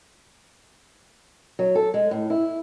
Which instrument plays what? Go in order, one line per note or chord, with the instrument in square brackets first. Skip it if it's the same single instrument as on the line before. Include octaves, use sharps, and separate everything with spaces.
[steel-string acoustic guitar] F#3
A4
G#3
A2
E4